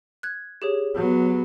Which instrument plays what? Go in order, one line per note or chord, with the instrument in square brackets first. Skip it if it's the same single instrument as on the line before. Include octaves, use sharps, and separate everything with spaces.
[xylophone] F#6 G#6
G4 G#4 C#5
[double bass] F#3 B3